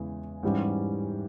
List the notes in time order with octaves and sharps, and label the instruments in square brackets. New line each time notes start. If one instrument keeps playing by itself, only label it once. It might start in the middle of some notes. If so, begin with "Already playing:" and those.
Already playing: [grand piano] E2 C#3 E3 G#3
G#2 E3 G3 C#4 G4